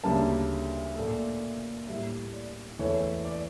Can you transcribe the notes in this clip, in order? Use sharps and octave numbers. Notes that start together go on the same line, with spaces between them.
D2 C#3 G3 A#3 A5
A#2 A3
A2 G3 A#3 E5
D5
E2 E3 A3 C#5
D5